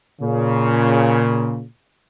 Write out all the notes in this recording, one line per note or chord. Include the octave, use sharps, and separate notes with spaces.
A#2 C#3